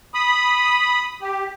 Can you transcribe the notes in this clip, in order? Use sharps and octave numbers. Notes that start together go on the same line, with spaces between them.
B5 D#6
G4